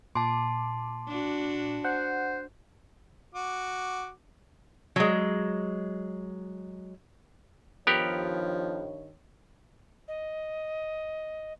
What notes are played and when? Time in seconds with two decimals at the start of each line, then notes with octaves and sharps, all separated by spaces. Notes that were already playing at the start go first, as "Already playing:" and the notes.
0.15 A#2 A5 C6 D6
1.07 D4 F#4
1.84 C5 F#5
3.34 F#4 D6
4.96 F#3 G#3
7.87 G2 D#3 F3 B3 G4 A#4 C#5
10.08 D#5